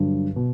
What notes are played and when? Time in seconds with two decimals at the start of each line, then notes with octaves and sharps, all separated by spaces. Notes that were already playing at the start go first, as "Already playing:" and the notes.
Already playing: G2 D3 F#3
0.36 B2